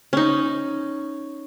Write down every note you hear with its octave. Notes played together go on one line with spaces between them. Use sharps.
C#4 D#4